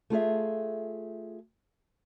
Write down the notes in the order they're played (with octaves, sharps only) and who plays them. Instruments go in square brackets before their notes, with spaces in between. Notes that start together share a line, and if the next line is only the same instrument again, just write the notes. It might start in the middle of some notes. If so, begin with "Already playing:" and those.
[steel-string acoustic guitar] A3 F4 G#4 E5